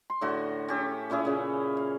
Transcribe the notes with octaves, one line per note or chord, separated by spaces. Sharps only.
C6
A2 D3 F#4
C#4 G4 A4
A#2 C#4 E4 G#4
A#2 C#3
F5